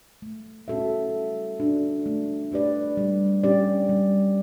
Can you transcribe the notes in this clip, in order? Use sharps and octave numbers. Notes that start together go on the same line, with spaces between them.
A3
C#4 F#4 A4 E5
G3
D4 F#4 A4
A3
D4 G4 B4 D5
G3
C#4 G4 D5
G3